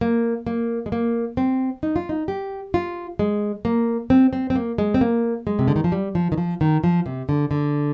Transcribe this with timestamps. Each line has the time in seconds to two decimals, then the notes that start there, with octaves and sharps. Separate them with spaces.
0.01 A#3
0.47 A#3
0.86 G#3
0.92 A#3
1.37 C4
1.83 D#4
1.96 F4
2.09 D#4
2.28 G4
2.74 F4
3.19 G#3
3.65 A#3
4.10 C4
4.33 C4
4.50 C4
4.56 A#3
4.78 G#3
4.94 C4
5.01 A#3
5.47 G#3
5.59 C3
5.68 D3
5.76 D#3
5.84 F3
5.92 G3
6.15 F3
6.32 D#3
6.38 F3
6.61 D#3
6.84 F3
7.06 C3
7.29 D3
7.51 D3